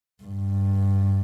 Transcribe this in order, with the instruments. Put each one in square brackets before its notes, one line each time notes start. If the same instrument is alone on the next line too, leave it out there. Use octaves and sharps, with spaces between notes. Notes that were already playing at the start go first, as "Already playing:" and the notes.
[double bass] G2